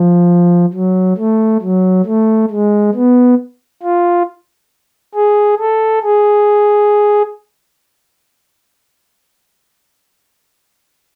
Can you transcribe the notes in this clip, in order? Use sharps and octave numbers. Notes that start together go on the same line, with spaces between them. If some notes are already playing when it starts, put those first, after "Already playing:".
Already playing: F3
F#3
A3
F#3
A3
G#3
B3
F4
G#4
A4
G#4